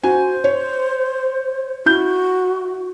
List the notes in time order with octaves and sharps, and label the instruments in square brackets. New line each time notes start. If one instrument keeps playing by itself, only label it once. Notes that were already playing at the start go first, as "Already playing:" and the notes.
[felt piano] F#4 G#5 [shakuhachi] C5
[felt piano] C#5
[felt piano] E4 G6 [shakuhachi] F#4